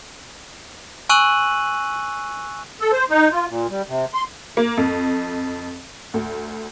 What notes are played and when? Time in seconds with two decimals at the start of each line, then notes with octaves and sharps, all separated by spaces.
1.09 G#5 C#6 E6 F#6 D#7 F#7
2.80 A4
2.92 C5
3.10 D#4
3.32 F4
3.49 A#2
3.70 G3
3.88 C3
4.14 C6
4.57 A#3
4.77 F2
6.14 D2